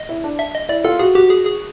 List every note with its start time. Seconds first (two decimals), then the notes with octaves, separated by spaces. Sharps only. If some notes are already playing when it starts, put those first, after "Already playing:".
Already playing: D#5
0.09 E4
0.24 D4
0.39 E5
0.54 D#5
0.69 E4 D5
0.84 F4 A4
0.99 F#4 G#4
1.15 F#4 G4
1.30 G#4
1.45 G#4